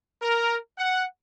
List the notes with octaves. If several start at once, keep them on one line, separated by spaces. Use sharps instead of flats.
A#4
F#5